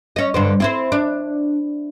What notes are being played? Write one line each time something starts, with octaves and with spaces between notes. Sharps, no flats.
C#4 D#5
G2 D3 C5
C4 E4 C5
D4